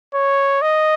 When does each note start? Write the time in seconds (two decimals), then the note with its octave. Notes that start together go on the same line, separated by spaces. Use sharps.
0.14 C#5
0.62 D#5